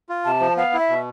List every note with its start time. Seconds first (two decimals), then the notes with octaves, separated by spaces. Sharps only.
0.09 F4
0.25 C3 A5
0.41 F3
0.57 B3 F5
0.74 E4
0.79 E5
0.89 B2